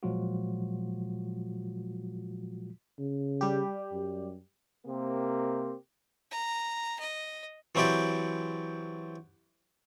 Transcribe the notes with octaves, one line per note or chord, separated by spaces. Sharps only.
A#2 F3 F#3 G#3 F4 F#4
C#3
G3 G4
F#2
C3 A#3 C4 G4 A#4
A#5
D#5
E3 F#3 C4 E4 G4 D5